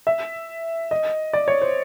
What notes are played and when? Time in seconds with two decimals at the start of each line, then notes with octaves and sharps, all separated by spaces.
0.07 E5
0.91 D#5
1.33 D5
1.48 C#5
1.62 C5